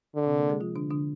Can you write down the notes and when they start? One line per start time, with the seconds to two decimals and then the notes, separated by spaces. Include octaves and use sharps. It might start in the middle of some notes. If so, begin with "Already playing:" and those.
0.15 D3
0.27 C3 C4
0.38 A#3 A#4
0.49 G#3 G#4
0.60 F3 F4
0.76 D3 D4
0.91 D3 D4